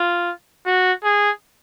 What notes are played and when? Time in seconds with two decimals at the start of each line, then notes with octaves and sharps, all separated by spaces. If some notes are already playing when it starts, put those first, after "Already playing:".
Already playing: F4
0.66 F#4
1.04 G#4